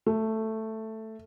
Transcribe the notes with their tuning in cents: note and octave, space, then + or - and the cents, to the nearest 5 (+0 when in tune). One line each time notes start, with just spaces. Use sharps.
A3 +5